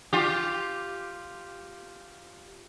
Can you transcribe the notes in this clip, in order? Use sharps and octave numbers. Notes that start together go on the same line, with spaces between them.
F4 G4